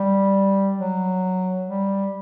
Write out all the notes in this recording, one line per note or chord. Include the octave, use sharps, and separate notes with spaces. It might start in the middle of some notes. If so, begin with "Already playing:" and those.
Already playing: G3
F#3
G3